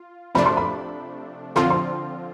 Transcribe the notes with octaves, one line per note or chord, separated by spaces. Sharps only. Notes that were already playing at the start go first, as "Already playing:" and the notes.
Already playing: F4
C3 F3 A3 D4 B5
C6
B5
D3 F3 C4 F4 C6
C6